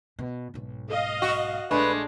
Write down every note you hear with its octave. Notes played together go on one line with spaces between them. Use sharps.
B2
B1 G#2
D#5 F5
F#4
A#1 G#3 A3 D4 B4